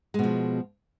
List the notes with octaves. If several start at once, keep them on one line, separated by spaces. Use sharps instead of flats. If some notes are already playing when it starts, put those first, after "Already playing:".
B2 F3 G#3